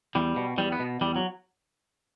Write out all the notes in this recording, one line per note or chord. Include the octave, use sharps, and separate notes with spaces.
E2 G3
B2
E2 G3
B3
B2
E2 G3
F#3